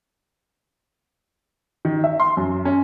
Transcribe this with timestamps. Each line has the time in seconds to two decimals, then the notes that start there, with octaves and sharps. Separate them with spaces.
1.85 D#3
2.04 E5
2.20 C6
2.37 F#2
2.65 C#4